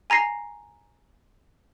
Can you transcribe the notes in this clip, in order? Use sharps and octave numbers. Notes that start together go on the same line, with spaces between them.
G#5 A#5 A#6 C7